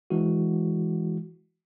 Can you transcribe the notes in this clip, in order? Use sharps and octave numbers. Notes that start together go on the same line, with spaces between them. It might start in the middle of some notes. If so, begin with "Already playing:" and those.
E3 G#3 E4 F#4